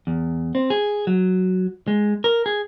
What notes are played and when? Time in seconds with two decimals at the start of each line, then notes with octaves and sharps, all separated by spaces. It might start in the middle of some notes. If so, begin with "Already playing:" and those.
0.07 E2
0.55 C4
0.70 G#4
1.07 F#3
1.88 G#3
2.24 A#4
2.46 G#4